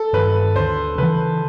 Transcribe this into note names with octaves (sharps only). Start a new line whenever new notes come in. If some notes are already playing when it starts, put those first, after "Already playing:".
Already playing: A4
G2 D#3 B4
D2 C5
C#3 E3 B4